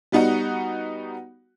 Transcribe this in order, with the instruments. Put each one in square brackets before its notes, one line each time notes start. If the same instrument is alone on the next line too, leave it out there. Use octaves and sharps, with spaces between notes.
[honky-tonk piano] G3 B3 D#4 F#4 F#5